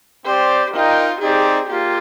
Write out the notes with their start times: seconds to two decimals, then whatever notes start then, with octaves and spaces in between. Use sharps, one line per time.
0.25 C4 G4 C5 D5
0.73 D#4 F4 A#4 D#5 G5
1.20 C4 D#4 G4 G#4 D5
1.68 A#3 F4 G4